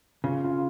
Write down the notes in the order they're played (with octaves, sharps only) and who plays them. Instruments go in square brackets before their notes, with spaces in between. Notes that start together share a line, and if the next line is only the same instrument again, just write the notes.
[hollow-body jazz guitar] C#3 [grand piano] F4
[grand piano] F4